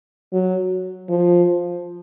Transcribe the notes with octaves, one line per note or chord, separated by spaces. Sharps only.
F#3
F3